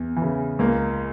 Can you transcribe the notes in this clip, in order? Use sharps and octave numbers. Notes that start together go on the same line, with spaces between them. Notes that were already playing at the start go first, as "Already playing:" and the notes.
Already playing: E2
E3
C#3
C#2 A#3